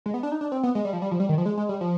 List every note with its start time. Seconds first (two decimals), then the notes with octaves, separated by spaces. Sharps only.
0.06 G#3
0.14 B3
0.23 D4
0.32 D#4
0.41 D4
0.52 C4
0.63 B3
0.75 G#3
0.85 G3
0.93 F3
1.02 G3
1.11 F3
1.20 G3
1.29 D#3
1.38 F3
1.46 G#3
1.58 G#3
1.69 G3
1.81 F3